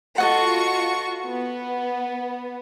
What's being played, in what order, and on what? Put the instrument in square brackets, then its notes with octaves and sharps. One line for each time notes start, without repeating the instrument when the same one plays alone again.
[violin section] F4 F#4 C#6 [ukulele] A4 D#5 F#5
[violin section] B3